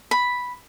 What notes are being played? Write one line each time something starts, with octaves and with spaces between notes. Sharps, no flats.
B5